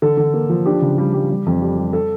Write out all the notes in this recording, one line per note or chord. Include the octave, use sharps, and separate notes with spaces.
D3 A4
D3
A#3
F3
D4 G4
C#3
G3
G3
G3
F2
G3
G3
A4